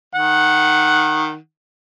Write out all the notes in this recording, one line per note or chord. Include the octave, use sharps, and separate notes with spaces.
D#3 F#5